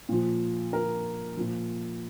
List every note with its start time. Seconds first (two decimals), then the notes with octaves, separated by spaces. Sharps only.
0.09 A#2 F3
0.73 A#4
1.37 A#2 F3